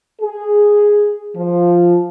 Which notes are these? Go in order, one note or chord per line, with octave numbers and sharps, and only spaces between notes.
G#4
F3